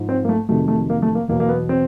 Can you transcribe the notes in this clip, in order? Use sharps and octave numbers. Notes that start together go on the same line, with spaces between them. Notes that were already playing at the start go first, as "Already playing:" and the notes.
Already playing: G#2 F3
C4
A#3
A3
F2 C3 D#3 F#3 A3
A3
A#3
A3
A#3
E2 B2 F#3 A#3
A#3
B3
C4